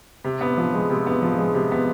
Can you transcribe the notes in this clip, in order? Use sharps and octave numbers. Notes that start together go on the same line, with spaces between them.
C3
B3
F3
G#3
C3
B3
F3
G#3
C3
B3